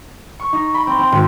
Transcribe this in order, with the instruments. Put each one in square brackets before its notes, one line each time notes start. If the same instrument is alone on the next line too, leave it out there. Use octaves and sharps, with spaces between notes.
[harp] C#6
D#4
B5
C4
C4
G#1